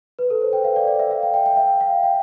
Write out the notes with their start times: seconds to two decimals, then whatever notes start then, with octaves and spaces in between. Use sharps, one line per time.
0.19 B4
0.30 A4
0.41 C5
0.53 G5
0.64 F5
0.76 D5
0.87 D5
0.99 E5
1.11 F5
1.23 G5
1.34 G5
1.46 G5
1.57 E5
1.81 F5
2.03 G5